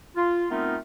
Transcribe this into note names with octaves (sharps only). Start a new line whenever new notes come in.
F4
A3 B3 C4 D#4 F4 A#4